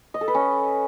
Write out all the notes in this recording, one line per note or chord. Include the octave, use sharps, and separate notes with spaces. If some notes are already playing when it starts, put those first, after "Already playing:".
D#5
A4
B4
C#4